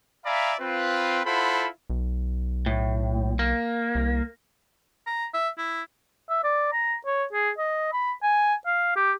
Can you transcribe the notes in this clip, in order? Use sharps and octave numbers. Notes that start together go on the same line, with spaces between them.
D5 E5 F5 G#5 A#5 B5
C4 F4 B4
E4 F4 A4 C5 F#5 B5
B1
A2
A#3
C2
A#5
E5
E4
E5
D5
A#5
C#5
G#4
D#5
B5
G#5
F5
G4